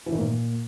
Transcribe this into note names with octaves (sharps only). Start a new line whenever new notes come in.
E3
D#3
A#2